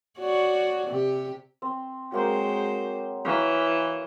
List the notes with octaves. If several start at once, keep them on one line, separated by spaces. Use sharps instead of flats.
F#4 C#5 D5
C3 G4
C4
F#3 G#3 A#3 C4 C5
E3 C#5 F5 A#5